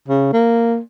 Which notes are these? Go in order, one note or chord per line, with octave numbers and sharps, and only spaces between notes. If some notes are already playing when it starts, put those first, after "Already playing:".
C#3
A#3